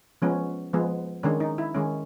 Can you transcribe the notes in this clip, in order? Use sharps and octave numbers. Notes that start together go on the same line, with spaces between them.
F3 G#3 B3 C#4
F3 G#3 B3
D#3 G#3 C#4 D4
D#4
E4
D#3 G#3 C#4